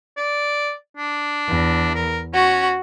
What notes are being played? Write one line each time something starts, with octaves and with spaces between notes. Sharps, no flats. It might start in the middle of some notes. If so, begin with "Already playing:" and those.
D5
D4
E2
A#4
C#4 F#4